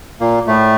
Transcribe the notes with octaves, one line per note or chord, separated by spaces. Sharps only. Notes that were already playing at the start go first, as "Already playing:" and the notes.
A#2 A#3
A2 A3